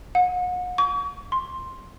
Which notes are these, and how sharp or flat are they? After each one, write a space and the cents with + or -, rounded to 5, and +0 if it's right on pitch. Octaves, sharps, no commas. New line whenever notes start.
F#5 -40
C#6 +40
C6 +5